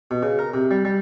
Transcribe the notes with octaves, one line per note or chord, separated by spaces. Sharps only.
B2
C#3
A#4
C3
G3
G3